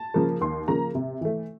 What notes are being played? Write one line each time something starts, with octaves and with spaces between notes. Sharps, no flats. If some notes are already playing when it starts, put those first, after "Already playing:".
Already playing: A5
C#3 F3 A#3
D#2 C6
C#3 F3 A#3 A#5
C3
E3 A3